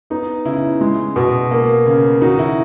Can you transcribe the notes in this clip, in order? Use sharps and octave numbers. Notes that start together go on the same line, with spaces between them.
B3 D#4
C#3 E4
G#3
B2
A#3
C#3
D#3 D#4 F#4
E4